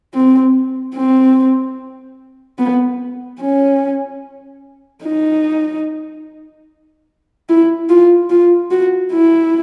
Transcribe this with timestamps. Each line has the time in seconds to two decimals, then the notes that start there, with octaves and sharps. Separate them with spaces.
0.14 C4
0.95 C4
2.58 B3
3.41 C#4
5.04 D#4
7.49 E4
7.89 F4
8.30 F4
8.71 F#4
9.13 E4